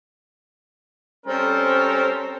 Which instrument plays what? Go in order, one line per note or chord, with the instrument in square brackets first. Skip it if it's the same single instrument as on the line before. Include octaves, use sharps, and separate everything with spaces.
[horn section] G3 C4 C#4 A4 A#4 C5